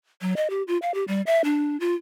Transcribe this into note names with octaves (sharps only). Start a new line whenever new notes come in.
F#3
D#5
G4
F4
F5
G4
G3
E5
D4
F4